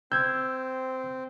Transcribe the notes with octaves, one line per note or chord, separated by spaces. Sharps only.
C4 E6 G6 G#6